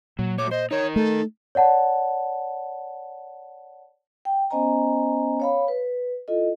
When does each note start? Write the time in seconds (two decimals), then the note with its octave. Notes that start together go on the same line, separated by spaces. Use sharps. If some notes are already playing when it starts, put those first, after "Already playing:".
0.19 A#2 F#3
0.38 F#3 A3 C#5 D6
0.51 C5 D#5
0.71 D#4 A#4 C#5
0.96 A3 A4
1.55 C#5 D5 F#5 A5
4.25 G5
4.50 B3 C#4 C5 D#5 G#5 A#5
5.40 C#5 F5 B5
5.68 B4
6.28 E4 F4 A4 D#5